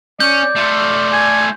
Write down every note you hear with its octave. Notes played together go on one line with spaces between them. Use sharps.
C#4 D5 G6
A3 F4
G#5